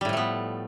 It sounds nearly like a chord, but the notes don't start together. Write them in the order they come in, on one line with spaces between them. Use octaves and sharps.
G3 A2 F3 A3 B3